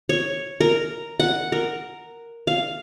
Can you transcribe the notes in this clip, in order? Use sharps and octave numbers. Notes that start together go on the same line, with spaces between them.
C#5
A#4
F#5
A#4
F5